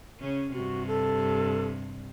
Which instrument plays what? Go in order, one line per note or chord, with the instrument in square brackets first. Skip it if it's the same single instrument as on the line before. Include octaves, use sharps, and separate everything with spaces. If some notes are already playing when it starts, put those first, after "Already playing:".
[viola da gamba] C#3 C#4
[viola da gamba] G2 C3 [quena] F#4
[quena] A4